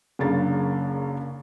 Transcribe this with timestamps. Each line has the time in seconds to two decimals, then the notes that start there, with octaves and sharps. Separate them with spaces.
0.19 F#1 F#2 C#3 D4 A6